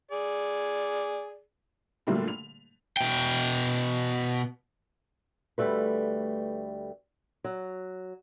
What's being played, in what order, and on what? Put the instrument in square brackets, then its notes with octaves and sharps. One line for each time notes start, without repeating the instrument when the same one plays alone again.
[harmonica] G#4 D5
[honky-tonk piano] A#2 D3 F#3 G3 A3 A#3
F7
[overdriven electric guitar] B2 G5
[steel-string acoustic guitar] D2 G3 A3 B4
F#3